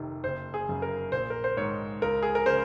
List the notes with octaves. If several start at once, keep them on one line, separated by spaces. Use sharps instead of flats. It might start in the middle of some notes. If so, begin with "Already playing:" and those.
Already playing: F1 C3 D#3
F#1 C5
G#4
F#2 C#3
A#4
A#1 C5
A#4
C5
G#2 D#3 C#5
C#2 A#4
G#4
A#4
C#3 C5